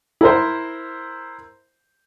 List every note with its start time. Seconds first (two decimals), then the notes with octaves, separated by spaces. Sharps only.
0.21 E4 A#4 C5